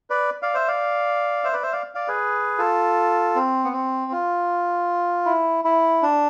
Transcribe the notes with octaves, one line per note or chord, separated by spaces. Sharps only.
B4 D5
D5 F5
C5 E5
D5 F5
C5 E5
B4 D5
C5 E5
D5 F5
D5 F5
G#4 B4
F4 A4
C4
B3
C4
F4
E4
E4
D4